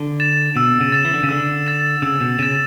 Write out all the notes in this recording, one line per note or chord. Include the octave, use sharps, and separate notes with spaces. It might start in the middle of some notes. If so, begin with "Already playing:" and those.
Already playing: D3
A6 E7
B2 E6
C#3
A6 E7
E3
D3
C#3
D3 E6
A6 E7
C#3 E6
B2
C#3 A6 E7